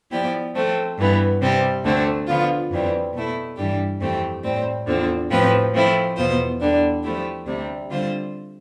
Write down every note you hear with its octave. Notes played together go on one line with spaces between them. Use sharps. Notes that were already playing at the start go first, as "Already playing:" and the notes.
F3 B3 E4 G4 D5
F3 A3 C4
G2 E3 B3
C3 G3 C4 G4
D2 D3 A3 C4
D3 F3 B3 F4
F2 E3 G3 C4
B2 A3 E4
G2 E3 G3 D4 G4
F2 E3 A3 C4 G4
A2 G3 C4
E2 D3 F3 C4
A2 F3 C4 G4 B4
F3 A3 C4 E4
E2 B2 B3 F4 C5
E2 D3 G3 D4
F3 A3 E4 G4
D2 C3 G3
D3 G3 C4 F4 C5